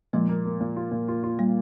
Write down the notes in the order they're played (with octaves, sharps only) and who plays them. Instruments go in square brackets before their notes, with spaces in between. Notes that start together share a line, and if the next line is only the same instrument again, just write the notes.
[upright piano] A#2 [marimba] F3 G#3
[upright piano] A#3
A#3
A#2
F4
A#2
F4
F4
[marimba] G3 A#3